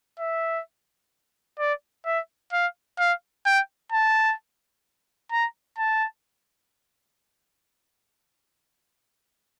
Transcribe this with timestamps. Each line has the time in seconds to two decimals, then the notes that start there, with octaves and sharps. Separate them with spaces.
0.19 E5
1.59 D5
2.06 E5
2.53 F5
2.99 F5
3.46 G5
3.92 A5
5.32 A#5
5.78 A5